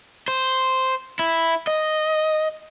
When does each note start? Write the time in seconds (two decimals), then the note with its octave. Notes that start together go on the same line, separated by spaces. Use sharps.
0.28 C5
1.19 E4
1.67 D#5